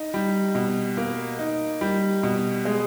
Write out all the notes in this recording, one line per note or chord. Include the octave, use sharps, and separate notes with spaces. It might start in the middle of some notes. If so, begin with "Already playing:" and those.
Already playing: D#4
G3
B2
A#3
D#4
G3
B2
G#3